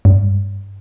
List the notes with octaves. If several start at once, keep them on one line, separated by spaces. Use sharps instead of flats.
G2